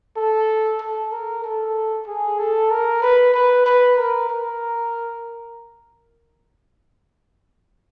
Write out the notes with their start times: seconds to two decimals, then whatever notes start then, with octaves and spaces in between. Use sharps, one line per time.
0.16 A4
0.81 A4
1.12 A#4
1.44 A4
2.07 G#4
2.39 A4
2.70 A#4
3.02 B4
3.34 B4
3.66 B4
3.97 A#4
4.29 A#4